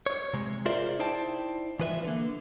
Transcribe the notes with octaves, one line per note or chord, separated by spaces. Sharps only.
C#5
C3 G#3
F4 G#4 A#4 C5 D5 E5
D#4 E4 C5 D5 G5 A5
E3 F3 B4 C5 E5
D3 A#3